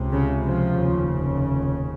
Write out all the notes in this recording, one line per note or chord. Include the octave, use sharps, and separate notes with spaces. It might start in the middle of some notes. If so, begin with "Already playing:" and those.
Already playing: C#2 C3
C#3
F3
F1 D#2 C#3